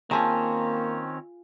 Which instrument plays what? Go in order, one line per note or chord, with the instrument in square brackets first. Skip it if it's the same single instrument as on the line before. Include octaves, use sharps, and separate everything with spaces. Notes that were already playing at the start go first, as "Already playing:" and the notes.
[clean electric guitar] D#3 C4 C#4 [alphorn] A#3 [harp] F4 G#4 G#5 [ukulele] A5